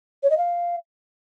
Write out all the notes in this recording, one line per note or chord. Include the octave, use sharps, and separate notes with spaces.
C#5
D#5
F5